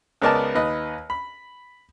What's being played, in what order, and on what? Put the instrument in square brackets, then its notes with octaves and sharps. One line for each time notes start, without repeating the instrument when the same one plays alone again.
[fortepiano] C#2 B3 A#4 D5 D#5 A5
D#2 B4 D#5
B5